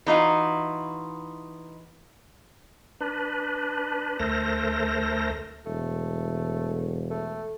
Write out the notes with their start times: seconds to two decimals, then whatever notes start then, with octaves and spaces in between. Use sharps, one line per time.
0.06 E3 D#4 F4 F#4
3.00 D4 B4
4.19 D2 A3 A4 A#4 C5 A#6
5.66 E1 A3
7.10 A3